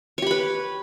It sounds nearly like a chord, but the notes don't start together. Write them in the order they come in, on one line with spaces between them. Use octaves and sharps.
C#5 G4 B5 B4